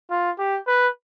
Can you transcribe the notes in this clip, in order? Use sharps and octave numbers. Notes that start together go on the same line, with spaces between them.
F4
G4
B4